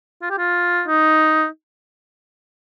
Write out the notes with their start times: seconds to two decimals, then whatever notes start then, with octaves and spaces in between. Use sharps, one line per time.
0.22 F4
0.30 G4
0.38 F4
0.88 D#4